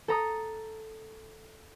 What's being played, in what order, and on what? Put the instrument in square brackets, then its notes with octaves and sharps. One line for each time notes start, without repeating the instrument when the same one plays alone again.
[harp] A4 A#5 D#6